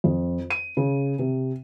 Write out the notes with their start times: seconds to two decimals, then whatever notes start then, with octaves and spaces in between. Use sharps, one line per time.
0.04 F2
0.50 D#7
0.77 C#3
1.19 C3